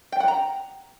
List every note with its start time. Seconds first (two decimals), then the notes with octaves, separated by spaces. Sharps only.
0.12 G5
0.20 F#5
0.28 A#5